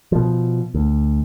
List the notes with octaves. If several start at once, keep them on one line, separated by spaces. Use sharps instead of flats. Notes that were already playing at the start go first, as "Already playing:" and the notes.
B2 F3
D2